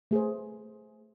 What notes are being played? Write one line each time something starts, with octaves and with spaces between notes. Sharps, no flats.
A3 G#4 B4 C5